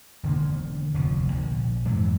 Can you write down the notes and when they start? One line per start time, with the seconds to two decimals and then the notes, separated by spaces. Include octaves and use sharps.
0.23 E1 D3 D#3 A#3
0.94 F1 D2 B2 F3
1.32 A#1
1.85 F2 G#2 E3 F#3